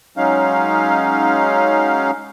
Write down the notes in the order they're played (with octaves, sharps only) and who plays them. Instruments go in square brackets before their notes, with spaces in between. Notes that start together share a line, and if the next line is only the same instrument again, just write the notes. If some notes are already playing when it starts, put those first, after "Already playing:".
[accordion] F#3 G#3 C#4 D#4 F5